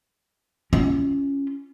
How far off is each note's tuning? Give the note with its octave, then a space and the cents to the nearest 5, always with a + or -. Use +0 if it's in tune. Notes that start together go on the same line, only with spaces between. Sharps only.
C#4 +0 F4 -30